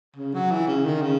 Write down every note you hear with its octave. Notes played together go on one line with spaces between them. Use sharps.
C#3
F#3
E3
C#3
D#3
C#3